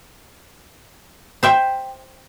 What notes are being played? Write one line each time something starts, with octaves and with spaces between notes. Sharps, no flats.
C5 E5 G5